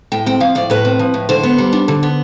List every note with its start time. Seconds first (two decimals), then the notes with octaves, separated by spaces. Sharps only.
0.12 A2 G5
0.26 C4 G5
0.40 F3 F5
0.55 A2 D5
0.70 A2 B4
0.85 C4
0.99 F3
1.14 A2
1.29 D3 C5
1.43 B3
1.58 G3
1.72 D4
1.88 D3
2.03 B3